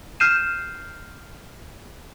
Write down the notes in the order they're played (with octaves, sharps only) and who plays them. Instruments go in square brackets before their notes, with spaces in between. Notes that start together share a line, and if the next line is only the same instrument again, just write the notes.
[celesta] F6 G6 C7 D#7 E7